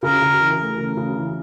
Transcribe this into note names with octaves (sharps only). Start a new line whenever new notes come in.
C#3 A#4
C#3
E3
A3
C#3
C#3
E3